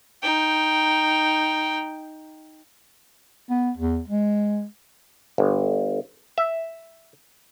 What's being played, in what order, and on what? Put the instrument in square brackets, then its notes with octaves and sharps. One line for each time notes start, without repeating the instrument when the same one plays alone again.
[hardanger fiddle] D#4 G5
[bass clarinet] B3
E2
G#3
[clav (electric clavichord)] G1
E5